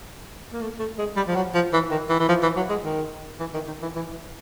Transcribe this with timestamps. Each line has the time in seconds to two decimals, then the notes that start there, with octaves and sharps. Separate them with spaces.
0.53 A#3
0.61 A3
0.79 A3
0.98 G#3
1.16 G3
1.27 F3
1.36 F#3
1.55 F3
1.73 E3
1.91 D#3
2.10 E3
2.20 E3
2.29 F3
2.43 E3
2.56 F#3
2.70 G#3
2.84 D#3
3.40 E3
3.54 D#3
3.67 D#3
3.82 E3
3.96 E3